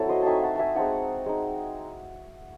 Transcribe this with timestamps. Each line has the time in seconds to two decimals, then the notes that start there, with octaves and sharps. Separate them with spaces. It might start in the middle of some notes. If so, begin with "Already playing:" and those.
Already playing: F#3 C4 E4 F#4 A4
0.09 C5 D#5
0.23 A3 C4 D#4 E5 G#5 A5
0.43 F#5 A5
0.55 E5 G#5 A5
0.76 G#3 C4 D#4 F#5 A5
1.26 G#3 D#4